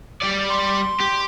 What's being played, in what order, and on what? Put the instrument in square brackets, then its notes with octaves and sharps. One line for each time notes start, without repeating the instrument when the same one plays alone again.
[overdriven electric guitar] G3 D5
[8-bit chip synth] C6
[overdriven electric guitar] G4